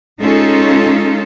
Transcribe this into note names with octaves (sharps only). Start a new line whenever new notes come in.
G#3 C#4 D#4 F4 A4